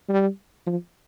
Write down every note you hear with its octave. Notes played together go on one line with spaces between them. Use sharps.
G3
F3